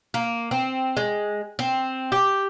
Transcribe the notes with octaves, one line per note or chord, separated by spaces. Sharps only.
A#3
C4
G#3
C4
G4